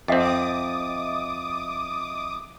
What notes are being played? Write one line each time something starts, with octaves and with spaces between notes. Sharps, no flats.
F2 C4 D#5 E5 D6 D#6 A6